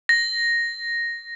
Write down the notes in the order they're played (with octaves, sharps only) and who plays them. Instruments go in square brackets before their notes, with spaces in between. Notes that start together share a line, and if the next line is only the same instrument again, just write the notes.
[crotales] A#6